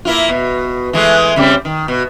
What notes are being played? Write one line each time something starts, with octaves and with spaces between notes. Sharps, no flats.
A#3 E4 F4
B2
E3 G#3 A3
C#3 G3 C4
D#3
B2